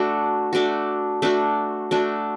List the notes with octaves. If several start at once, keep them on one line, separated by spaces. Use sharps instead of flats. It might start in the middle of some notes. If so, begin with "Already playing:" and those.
Already playing: A3 D4 F#4
A3 D4 F#4
A3 D4 F#4
A3 D4 F#4